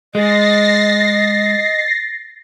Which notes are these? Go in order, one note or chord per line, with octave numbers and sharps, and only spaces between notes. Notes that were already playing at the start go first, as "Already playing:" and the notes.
G#3 D#5 A6 A#6 C7